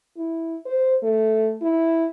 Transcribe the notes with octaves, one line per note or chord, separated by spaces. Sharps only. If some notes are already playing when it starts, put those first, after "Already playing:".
E4
C5
A3
E4